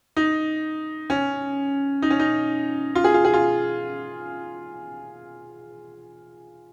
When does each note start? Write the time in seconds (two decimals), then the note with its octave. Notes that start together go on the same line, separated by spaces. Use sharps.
0.17 D#4
1.10 C#4
2.02 D#4
2.10 C#4
2.19 D#4
2.95 F4
3.04 G#4
3.14 F4
3.25 G#4
3.34 F4